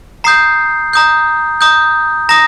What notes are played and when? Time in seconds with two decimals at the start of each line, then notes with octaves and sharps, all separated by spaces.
0.24 A#5 D#6 G6 C7
0.93 A#5 D#6 G6
1.61 A#5 D#6 G6
2.29 A#5 D#6 A#6